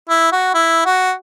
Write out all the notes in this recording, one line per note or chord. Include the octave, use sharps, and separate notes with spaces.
E4
F#4
E4
F#4